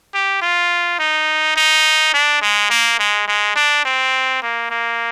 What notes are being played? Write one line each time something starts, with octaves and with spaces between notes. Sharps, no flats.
G4
F4
D#4
D#4
D4
G#3
A#3
G#3
G#3
D4
C4
A#3
A#3